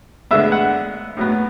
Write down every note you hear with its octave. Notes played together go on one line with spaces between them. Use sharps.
D3 G#3 B3 E5
F#5
A2 F#3 B3